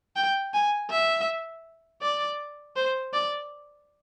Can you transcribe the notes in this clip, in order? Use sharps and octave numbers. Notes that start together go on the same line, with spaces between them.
G5
G#5
E5
D5
C5
D5